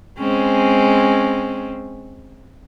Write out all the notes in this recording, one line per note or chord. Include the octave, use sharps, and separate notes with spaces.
G#3 C4 C#4